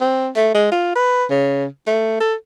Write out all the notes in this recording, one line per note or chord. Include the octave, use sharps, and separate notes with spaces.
C4
A3
G#3
F4
B4
C#3
A3
A4